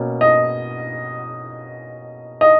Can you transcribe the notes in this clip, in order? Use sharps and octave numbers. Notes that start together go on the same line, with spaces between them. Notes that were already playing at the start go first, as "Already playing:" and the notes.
Already playing: B2 A#3 C#4
D#5
D#5